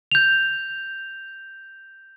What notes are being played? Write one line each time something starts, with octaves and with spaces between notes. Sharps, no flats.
G6 F7